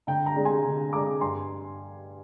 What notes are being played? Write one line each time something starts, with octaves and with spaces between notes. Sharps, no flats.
D3 G5 A#5
G5 A#5
G#3 D4
G#5 C6
D3
G#3 D4 A#5 D6
G2 G#5 C6